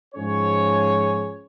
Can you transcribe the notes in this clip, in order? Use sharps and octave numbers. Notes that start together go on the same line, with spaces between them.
G#2 F3 C#4 G#4 C#5